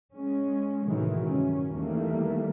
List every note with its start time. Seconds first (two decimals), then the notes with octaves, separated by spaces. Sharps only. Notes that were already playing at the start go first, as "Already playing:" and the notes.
0.12 G#3 C#4
0.86 A2 C3 D#3 E3 F#3 G#3
1.27 G2 C#4
1.73 E2 D#3 E3 G3 A3 A#3